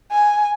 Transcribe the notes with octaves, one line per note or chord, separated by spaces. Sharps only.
G#5